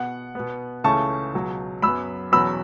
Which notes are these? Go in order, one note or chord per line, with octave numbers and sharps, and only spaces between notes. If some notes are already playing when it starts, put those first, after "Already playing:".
Already playing: B2 B3 F#5
B2 B3
C#2 C#3 E3 A3 C#4 A5 C#6
C#2 B2 F#3
F#2 F#3 B3 B5 E6
E2 B2 F#3 C#4 B5 E6